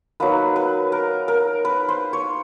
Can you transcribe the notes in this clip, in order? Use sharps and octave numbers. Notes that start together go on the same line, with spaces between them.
F#3 A#3 D#4 B4
B4
A#4
A#4
B4
C5
C#5